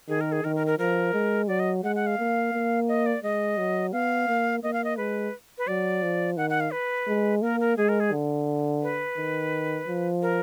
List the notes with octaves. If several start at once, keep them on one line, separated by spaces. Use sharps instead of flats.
D#3 G#4
A#4
G#4
D#3 A#4
A#4
A#4
F3 A#4
G#3
F#3 D5
D#5
G#3 F#5
F#5
F5
A#3
A#3
D#5
D5
G#3 D#5
F#3
B3 F5
A#3
A#3 D#5
F5
D#5
G#3 B4
B4
F#3 D5
F3
D#3 F#5
F#5
F5
B4
G#3
A#3 A#4
A#4
G#3 G#4
A#4
G#4
D3
B4
D#3
F3
A#4